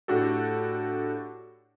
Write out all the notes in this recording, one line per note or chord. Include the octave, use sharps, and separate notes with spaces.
A2 D4 F#4 G4 A4